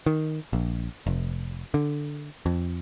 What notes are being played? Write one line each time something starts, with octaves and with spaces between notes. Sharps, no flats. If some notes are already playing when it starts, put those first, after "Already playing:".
D#3
A#1
F1
D3
F2